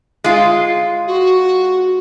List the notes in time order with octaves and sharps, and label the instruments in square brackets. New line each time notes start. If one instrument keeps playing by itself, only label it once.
[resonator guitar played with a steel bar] G#3 F4
[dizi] F#4